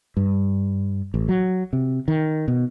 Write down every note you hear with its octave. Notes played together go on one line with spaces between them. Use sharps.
G2
A1
F#3
C3
D#3
B2